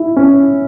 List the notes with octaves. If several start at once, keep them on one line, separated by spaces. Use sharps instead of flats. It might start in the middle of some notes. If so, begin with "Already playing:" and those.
Already playing: E4
C#4